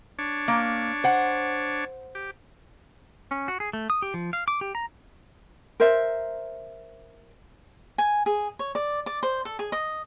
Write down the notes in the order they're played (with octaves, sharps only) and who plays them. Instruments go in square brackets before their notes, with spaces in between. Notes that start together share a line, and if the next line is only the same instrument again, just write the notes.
[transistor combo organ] D4 C#5
[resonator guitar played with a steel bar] A#3
C5 F#5
[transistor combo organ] G4
[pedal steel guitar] C#4
F#4
G#4
A3
D#6
G4
F3
F5
D6
G4
A#5
[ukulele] A#4 C5 E5
[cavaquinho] G#5
G#4
C#5
D5
D5
C5
A4
G#4
D#5